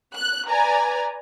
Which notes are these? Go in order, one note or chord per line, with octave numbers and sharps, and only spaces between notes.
F#6
B4 D5 G#5 A#5